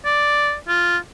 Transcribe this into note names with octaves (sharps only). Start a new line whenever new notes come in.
D5
F4